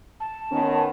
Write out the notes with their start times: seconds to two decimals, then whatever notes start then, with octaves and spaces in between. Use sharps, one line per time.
0.20 A5
0.52 D#3 B3 C#4